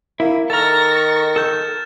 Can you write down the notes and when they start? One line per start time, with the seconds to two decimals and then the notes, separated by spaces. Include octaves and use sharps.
0.20 A#3 E4
0.50 D#3 A4 A#5 C#6 F6 A6 A#6
1.36 A4 G6 E7